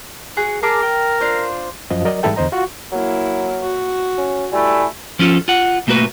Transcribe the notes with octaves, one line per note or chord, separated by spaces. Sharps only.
F#4 G#4 F#5
G#4 A#4 A5 D6
G5
D4 F4 C5
F#2 F3 D#5
F#3 A#4 D5 D#5
G#2 E3 G3 E4 A4 G5
E2 D3 C5 D#5 A#5
F4 F#4 C#6
F#3 A#3 E4
F#4
C#4
G3 A3 E4 G#5
F3 C#4 F4 F#4 A4
F4 F#5
B1 A3 A#3 F#4 B4